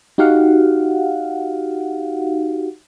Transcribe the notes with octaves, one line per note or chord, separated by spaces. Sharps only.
D#4 F#4 G4 F5 F#5